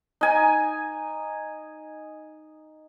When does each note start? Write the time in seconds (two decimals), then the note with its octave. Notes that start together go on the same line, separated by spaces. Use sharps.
0.21 D#4 G#5